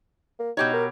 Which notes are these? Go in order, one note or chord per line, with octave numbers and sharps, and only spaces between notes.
A#3
B2 D#4 G4 C#5
A#4